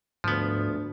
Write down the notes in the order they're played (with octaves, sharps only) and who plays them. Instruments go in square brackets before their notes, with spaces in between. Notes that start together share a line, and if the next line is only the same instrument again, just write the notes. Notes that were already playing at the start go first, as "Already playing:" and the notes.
[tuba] D2 [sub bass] G#2 [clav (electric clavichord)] F3 B3